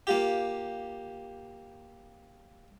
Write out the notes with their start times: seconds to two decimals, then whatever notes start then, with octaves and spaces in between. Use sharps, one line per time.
0.07 A#3 F4 G4